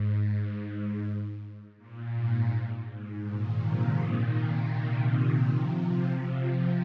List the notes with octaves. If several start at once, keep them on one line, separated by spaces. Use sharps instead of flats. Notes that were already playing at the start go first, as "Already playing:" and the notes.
Already playing: G#2
A#2
G#2
G#2
A#2 D#3
C3 F3
A#2 D#3
C3
A#2
A#2 D#3
C3 F3
C3 F3